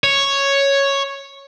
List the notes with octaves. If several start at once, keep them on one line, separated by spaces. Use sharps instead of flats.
C#5